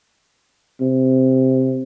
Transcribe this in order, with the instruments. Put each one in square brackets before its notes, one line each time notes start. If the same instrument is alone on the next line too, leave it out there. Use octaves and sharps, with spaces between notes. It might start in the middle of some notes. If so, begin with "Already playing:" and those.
[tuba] C3